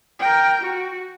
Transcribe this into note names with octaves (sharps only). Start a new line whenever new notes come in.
A#4 G5
F#4